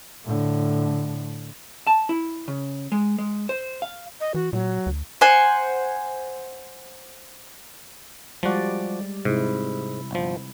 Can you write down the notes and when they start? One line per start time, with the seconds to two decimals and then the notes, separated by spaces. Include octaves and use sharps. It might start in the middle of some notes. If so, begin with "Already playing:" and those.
0.25 A2 D3
1.87 A5
2.09 E4
2.48 C#3
2.92 G#3
3.18 G#3
3.49 C5
3.82 F5
4.21 D#5
4.34 E3 F#4
4.53 A#2 F#3
4.86 D2
5.21 C5 F#5 G#5
8.43 F3 G3 G#3 F#4 D5
9.25 G#2 C3 E4
10.11 G1 F3